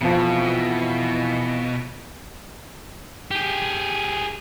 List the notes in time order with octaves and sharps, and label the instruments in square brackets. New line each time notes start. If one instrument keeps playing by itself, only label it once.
[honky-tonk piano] F2 F3 [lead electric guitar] B2 [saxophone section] E3
[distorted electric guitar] G4 G#4